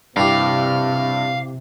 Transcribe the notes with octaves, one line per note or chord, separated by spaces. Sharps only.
G2 C3 E3 G4 F5